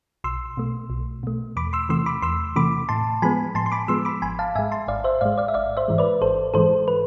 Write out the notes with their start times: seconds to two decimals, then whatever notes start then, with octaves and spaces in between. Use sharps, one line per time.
0.24 B1 C6 E6
0.57 B2 A3
0.90 B1
1.23 B2 A3
1.56 E2 B5 D6
1.73 C6 E6
1.89 C3 E3 A3 C6 E6
2.06 B5 D6
2.22 E2 C6 E6
2.56 C3 E3 A3 B5 D6
2.89 A2 A5 C6
3.22 F3 G#3 B3 G#5 B5
3.55 A2 A5 C6
3.66 C6
3.72 B5 D6
3.88 F3 G#3 B3 C6 E6
4.05 B5 D6
4.22 G#1 G#5 B5
4.39 F5 A5
4.55 G#2 G#3 E5 G#5
4.72 A5 C6
4.88 G#1 D5 F5
5.04 C5 E5
5.21 G#2 G#3 D5 F5
5.38 D5 F5
5.48 E5
5.54 G#1 D5 F5
5.77 C5 E5
5.88 G#2 E3 G#3
5.98 B4 D5
6.22 G#1 A4 C5
6.54 G#2 E3 G#3 A4 C5
6.88 B4